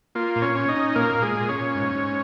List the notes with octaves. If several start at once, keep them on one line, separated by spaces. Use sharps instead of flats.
A#3 F4
A#2
C#4 C#5
C#4
D#4 D#5
C#4
A#2 A#3 A#4
A#2
G#3 G#4
A#2
C#4 C#5
A#2
G#2
G#2